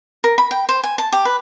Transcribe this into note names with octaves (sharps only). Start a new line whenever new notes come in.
A#4
B5
G5
C5
G#5
A5
G4
B4